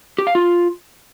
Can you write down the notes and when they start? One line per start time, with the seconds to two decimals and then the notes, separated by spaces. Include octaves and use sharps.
0.18 G4
0.27 F5
0.35 F4